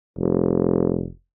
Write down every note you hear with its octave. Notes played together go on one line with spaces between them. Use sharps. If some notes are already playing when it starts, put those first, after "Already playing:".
F1